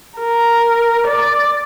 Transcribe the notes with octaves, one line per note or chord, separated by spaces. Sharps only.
A#4
D5